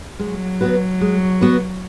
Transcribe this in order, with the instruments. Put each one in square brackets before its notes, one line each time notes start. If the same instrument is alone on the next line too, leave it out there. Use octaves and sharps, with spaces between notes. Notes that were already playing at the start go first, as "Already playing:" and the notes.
[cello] F#3 [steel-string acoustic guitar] G#3
[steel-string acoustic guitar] B3 F#4 B4
G#3
B3 F#4 B4